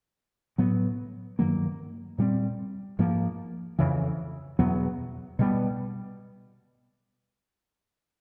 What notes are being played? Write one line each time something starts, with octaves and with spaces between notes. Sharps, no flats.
A2 F#3 B3
G2 D#3 F#3 A#3
A#2 G3 C4
G#2 F3 A#3
F2 C#3 E3
E2 B2 F#3 B3
B2 G3 B3